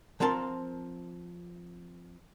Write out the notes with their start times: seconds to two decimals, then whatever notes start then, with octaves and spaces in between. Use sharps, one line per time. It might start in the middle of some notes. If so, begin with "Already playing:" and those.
0.20 F3 C4 A#4 A5 C6